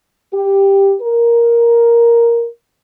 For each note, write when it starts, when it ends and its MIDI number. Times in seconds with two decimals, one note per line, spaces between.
0.33 0.95 67
1.02 2.47 70